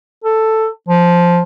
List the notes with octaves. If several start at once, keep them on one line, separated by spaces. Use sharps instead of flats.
A4
F3